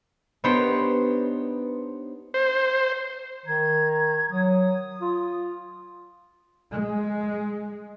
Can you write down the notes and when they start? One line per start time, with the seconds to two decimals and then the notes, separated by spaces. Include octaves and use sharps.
0.44 B3 D4 D#4 G4 C5 C#5
2.34 C5
3.46 D#3 A#5 G#6
4.30 F#3 D#6
5.01 F4
6.72 G#3